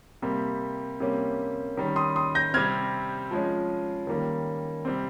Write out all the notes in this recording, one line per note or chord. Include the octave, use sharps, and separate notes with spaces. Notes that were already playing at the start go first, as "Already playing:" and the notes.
C3 G3 A#3
C3 G3 A#3 C#4
D#3 G3 C#4
C6 D#6
C6 D#6
G6 A#6
C3 G3 C4 F6 G#6
F3 G#3 C#4
D#3 G3 A#3 C#4
C3 G3 C4